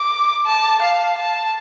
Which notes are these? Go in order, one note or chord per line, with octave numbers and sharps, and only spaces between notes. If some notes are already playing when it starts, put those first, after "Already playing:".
Already playing: D6
A5
F5
A5